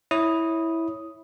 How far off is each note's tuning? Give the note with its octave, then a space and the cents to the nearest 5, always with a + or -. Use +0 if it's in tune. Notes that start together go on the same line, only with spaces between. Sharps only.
E4 -10 C#5 +0 D#6 +0